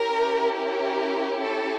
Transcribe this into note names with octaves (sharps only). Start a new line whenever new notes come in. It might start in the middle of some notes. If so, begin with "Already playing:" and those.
Already playing: C#4 E4 G4 A#4
A#4
A4